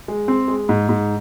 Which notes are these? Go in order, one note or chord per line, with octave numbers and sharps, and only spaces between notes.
G#3
C4
G#3
G#2
G#2